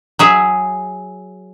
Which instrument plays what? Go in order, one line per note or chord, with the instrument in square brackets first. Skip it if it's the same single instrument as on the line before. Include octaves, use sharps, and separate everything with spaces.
[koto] F#3 G#4 E5